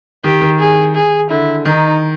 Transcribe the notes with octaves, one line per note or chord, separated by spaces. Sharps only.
D#3 G4
D#3
G#4
G#4
D3 E4
D#3 D#4